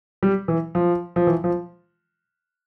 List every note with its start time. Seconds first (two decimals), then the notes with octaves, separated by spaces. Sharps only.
0.23 G3
0.48 E3
0.75 F3
1.16 F3
1.27 E3
1.44 F3